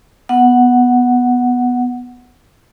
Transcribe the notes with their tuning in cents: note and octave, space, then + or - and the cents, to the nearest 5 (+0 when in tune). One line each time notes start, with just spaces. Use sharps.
B3 +0 F#5 +0